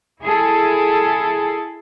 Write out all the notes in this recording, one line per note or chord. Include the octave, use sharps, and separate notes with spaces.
E4 G#4 A4